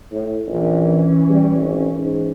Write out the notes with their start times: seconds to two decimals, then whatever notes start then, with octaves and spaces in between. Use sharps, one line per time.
0.12 A2
0.47 A#1 E3 C#4
1.30 G3
1.58 G#1
1.98 G#2